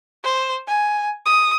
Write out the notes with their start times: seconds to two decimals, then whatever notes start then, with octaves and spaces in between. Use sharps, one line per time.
0.24 C5
0.67 G#5
1.26 D#6